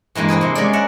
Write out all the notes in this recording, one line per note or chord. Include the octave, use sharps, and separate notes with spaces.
G2 E3 G#3 A#3
A#3 C4 G#4 B4
C3 G#3
G#3 C#4 D5
A#4 E5 F#5